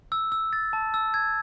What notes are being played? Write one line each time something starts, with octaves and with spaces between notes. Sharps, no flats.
E6
E6
A6
A5
E6
G#6